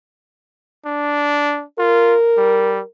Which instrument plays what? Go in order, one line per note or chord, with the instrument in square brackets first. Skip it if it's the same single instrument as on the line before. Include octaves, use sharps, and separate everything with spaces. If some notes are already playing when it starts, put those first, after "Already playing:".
[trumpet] D4
[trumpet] F4 [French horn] A#4
[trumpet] G3